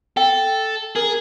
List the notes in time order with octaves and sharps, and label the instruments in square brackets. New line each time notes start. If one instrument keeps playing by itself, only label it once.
[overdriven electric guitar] A4 [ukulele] G5
[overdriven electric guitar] G#4 [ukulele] A#4